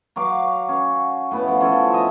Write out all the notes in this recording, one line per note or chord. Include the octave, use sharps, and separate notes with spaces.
F#3 F#4 F5 D6
C#4
A2 B3
F3 C#4
F3 C#4 A4
D#5 E5